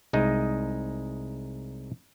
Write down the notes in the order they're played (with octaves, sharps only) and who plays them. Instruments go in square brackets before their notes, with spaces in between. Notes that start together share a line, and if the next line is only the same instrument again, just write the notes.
[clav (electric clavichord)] C2 G#3 D#4